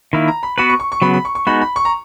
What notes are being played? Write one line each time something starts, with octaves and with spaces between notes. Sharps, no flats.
D#3 A#3 E4 B5
A#5
B5
B3 F#4 B4 B5
C#6
C#6
C#6
C#3 F#3 B3 B5
B5
C#6
C#6
G#3 B3 D#4 F#4 B5
B5
C#6
A#5